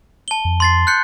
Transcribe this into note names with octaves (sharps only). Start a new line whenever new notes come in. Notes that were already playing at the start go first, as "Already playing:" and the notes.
A5 G7
F2
C6 A6 C7
F#6 G6 C#7